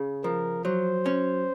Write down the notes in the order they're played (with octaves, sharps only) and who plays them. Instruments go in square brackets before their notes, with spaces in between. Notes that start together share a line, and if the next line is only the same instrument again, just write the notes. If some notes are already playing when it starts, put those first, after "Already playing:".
Already playing: [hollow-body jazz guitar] C#3
[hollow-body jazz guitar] F3 [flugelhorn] A#4
[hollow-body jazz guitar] F#3 [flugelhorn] C5
[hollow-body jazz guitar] C#4